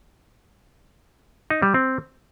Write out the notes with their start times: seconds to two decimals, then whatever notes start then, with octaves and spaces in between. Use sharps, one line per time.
1.50 D#4
1.62 G3
1.74 C4